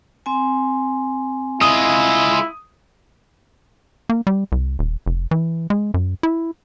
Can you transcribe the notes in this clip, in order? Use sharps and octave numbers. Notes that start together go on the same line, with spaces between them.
C4 G#5
G#3 E4 F4 D#6
A#3
G3
C2
D#1
F1
E3
G#3
F#2
E4